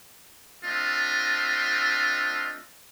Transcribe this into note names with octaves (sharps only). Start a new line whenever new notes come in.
A3 C4 D4 F4 D#5 E5